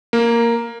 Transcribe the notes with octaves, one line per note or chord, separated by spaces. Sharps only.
A#3